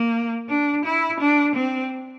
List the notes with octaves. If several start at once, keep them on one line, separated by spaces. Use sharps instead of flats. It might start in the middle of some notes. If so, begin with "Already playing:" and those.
Already playing: A#3
D4
E4
D4
C4